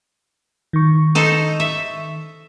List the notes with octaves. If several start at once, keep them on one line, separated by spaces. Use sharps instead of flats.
D#3 C#6
D#4 A4 C5
E5